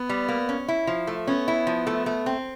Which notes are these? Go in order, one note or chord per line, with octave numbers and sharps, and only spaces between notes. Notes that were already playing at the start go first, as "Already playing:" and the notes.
Already playing: B3
G3
A#3
C#4
E4
F3
A3
B3 C#4
E4
F3
A3
A3
C4